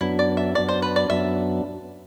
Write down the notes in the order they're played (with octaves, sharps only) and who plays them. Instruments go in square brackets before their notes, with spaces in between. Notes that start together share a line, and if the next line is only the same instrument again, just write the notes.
[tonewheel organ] F#2 F#3 B3 D4 [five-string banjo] E4
[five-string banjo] D5
E5
[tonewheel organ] F#2 F#3 B3 D4 [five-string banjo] D5
[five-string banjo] C5
B4
D5
[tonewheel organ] F#2 F#3 B3 D4 [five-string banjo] E5